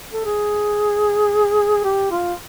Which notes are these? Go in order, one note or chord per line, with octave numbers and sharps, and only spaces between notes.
A4
G#4
G4
F4